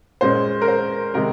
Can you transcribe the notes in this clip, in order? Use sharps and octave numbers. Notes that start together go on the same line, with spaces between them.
A#2 G#3 C#4 C5
A#4
C5
C3 D#3 G#3 D#4 A#4